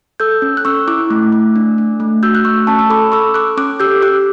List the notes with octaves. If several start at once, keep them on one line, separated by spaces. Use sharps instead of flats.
A4 E6 G6
C#4
F#6
C#4 C#6 E6
E4 D6 F#6
A3
A3
D4
D4
A3
F#4 E6 G6
F#6
A3 C#6 E6
C#4 A5 C#6
E6
A4 B5 D6
A4 C#6 E6
A4 D6 F#6
C#4 D6 F#6
G4 E6 G6
G4 D6 F#6